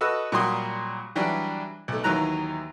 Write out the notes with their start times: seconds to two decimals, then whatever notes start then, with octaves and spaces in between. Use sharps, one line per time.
0.01 F#4 A4 B4 D#5 E6 F#6
0.32 A#2 F#3 G3 F#4 C6 D#6
1.16 E3 F#3 G3 D4
1.88 B1 A3
2.04 D#2 D#3 E3 F#3 A#5 F#6